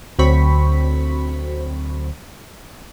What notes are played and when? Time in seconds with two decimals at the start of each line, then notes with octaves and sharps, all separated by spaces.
0.19 D2 F#3 C4 B5 C#6 B6